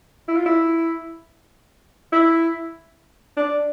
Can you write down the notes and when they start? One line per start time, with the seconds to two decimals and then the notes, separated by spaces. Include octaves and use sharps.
0.28 E4
0.37 F4
0.46 E4
2.12 E4
3.37 D4